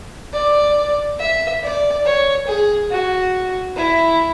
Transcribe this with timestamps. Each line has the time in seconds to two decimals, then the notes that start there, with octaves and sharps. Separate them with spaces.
0.33 D5
1.19 E5
1.62 D5
2.05 C#5
2.47 G#4
2.90 F#4
3.76 E4